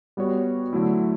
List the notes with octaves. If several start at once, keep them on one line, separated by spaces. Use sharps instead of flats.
G3 B3 F#4 C#5
D3 F#3 A3 E4